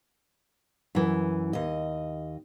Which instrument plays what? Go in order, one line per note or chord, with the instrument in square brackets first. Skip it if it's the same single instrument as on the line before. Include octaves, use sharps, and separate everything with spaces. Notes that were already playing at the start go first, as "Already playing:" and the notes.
[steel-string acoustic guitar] F#2 E3
D#2 D#5